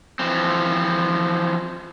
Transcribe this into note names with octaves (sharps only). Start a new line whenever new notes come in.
E3 F3 C4